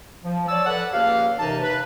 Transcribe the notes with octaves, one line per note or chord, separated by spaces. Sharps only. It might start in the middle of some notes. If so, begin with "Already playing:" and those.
F3
C#5 D5 A5 E6
A4 B4 D5 F#5
C#2 A#3 G4 F5
D#2 C3 E3 D#4 A5
B4